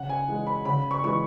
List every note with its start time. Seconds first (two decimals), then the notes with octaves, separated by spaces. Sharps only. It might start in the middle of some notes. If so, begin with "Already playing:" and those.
Already playing: C#3 F#5
0.09 G#5
0.28 E3 G#3
0.47 B5
0.65 C#3 B5
0.91 C#6
1.03 E3 G#3 C#6